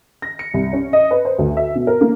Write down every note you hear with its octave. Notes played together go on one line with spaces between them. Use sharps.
A#6
C#7
C2
C#4
D#5
B4
C5
D2
E5
B2
A#4
A#3